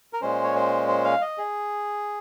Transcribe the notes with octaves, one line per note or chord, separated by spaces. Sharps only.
A#4
A#2 G#3 C#4 C5
C#5
C5
C5
F5
D#5
G#4